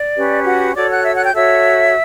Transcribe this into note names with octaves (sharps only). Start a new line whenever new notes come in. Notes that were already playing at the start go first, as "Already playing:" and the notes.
Already playing: D5
C#4 G4 B4
F#4 F#5
F#4 A4 C#5 D5 D6
F#5 F#6
E5 E6
F#5 F#6
G5 G6
F#4 A4 C#5 E5 E6